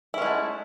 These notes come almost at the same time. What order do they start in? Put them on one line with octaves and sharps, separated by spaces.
E4 C#4 G#3 A3